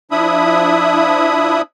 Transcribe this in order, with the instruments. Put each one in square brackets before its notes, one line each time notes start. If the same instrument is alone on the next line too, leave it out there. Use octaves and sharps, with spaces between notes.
[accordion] F3 D4 E4 E5 B5 D#6